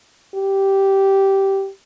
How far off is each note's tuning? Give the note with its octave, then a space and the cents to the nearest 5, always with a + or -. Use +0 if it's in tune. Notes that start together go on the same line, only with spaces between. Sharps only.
G4 -10